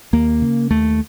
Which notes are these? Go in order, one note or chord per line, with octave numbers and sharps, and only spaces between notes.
D#2 A#3
C#3
D#2 A3